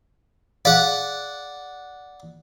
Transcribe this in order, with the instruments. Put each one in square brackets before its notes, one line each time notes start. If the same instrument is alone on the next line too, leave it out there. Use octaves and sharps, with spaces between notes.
[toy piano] G#4 F5 [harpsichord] D5 F#5